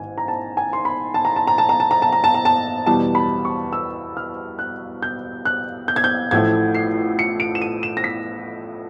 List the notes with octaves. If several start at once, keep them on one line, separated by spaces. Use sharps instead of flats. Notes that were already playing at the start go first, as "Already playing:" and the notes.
Already playing: A1 G#2 D#3 G#5
A#5
A5
G#5
C6
B5
A5
A#5
A5
A#5
A5
A#5
A5
A#5
A5
A#5
A5
A#5
A5
E2 B2 G3 A5
B5
C#6
E6
F6
F#6
G6
F#6
G6
G#6
G6
A1 A2 F3 A3 G#6
C7
C#7
D7
E7
D#7
E7
A#6
B6